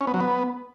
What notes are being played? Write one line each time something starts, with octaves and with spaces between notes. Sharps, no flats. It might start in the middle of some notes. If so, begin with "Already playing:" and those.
C#4
B3
F#3
B3